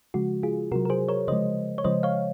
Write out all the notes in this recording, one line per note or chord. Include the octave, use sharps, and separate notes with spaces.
C#3 F3 G#3 F#4
F4 G#4
C3 F#3 F#4 A#4
A#4
G#4 C5
A#4 C#5
C#3 F3 G#3 C5 D#5
C#5
C#3 F3 G#3 C5 D#5
C#5 F5